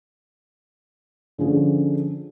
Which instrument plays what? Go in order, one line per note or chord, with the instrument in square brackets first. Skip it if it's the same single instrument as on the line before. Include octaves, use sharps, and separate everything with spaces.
[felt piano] D3 F3 C#4 G#4